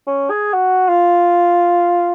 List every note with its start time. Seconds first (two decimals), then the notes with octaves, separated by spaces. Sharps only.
0.07 C#4
0.30 G#4
0.54 F#4
0.88 F4